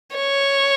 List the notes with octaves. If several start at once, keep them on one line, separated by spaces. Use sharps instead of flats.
C#5